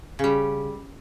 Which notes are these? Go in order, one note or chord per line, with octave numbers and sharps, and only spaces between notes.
C#3 G3